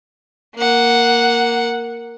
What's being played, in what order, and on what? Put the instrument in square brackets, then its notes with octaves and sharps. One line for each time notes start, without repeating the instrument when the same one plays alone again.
[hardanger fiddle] A#3 F#5